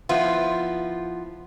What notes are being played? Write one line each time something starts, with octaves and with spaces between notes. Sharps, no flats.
F3 B3 E4 F4